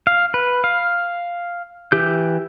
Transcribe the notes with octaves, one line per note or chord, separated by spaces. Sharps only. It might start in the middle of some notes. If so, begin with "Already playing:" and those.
F5
B4
F5
E3 G4 G6